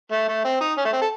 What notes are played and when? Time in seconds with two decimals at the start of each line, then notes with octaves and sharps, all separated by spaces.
0.12 A3
0.28 A3
0.45 C4
0.61 D#4
0.78 C#4
0.85 A3
0.93 C4
1.02 A4